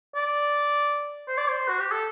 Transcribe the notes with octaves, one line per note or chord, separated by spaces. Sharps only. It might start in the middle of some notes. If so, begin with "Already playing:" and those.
D5
C5
D5
C5
F#4
G4
A4